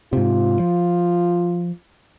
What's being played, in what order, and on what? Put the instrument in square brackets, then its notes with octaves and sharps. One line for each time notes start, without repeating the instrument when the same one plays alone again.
[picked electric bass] G#2 C3 [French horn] F4
[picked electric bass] F3